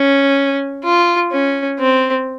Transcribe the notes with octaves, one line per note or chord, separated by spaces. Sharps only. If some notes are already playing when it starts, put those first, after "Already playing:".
Already playing: C#4
F4
C#4
C4